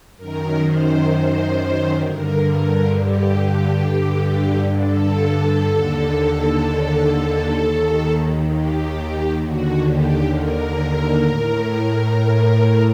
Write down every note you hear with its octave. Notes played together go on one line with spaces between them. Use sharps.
F#2 D#3 A#4
C5
C5
G2 D3 A#4
A#4
G4
G2 D3
A4
D#2 D3
D#2 D#3
G4
D#2 D3 F#4
G4
A#4
A2